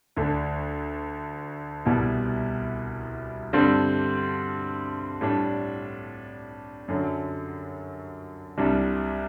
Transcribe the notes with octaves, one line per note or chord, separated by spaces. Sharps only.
D2 D3 A3 D4
C2 B2 G3 B3 E4
G2 D3 G3 C4
A2 G3 D4
F#2 D3 F#3
C2 C3 G3 D4